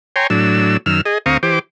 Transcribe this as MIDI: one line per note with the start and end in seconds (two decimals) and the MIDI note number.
0.16 0.27 73
0.16 0.27 79
0.16 0.27 80
0.16 0.27 82
0.16 0.27 84
0.30 0.77 45
0.30 0.77 54
0.30 0.77 62
0.30 0.77 88
0.86 1.01 42
0.86 1.01 51
0.86 1.01 88
0.86 1.01 89
1.05 1.18 68
1.05 1.18 75
1.26 1.37 38
1.26 1.37 60
1.26 1.37 77
1.26 1.37 82
1.26 1.37 85
1.26 1.37 87
1.43 1.59 52
1.43 1.59 67
1.43 1.59 72
1.43 1.59 86